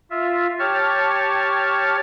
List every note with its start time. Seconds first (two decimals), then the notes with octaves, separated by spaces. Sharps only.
0.11 F4 E5
0.59 G4 C#5 A5 C#6 F6